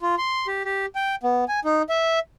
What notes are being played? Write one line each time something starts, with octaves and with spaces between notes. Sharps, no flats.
F4
C6
G4
G4
G5
B3
G#5
D#4
E5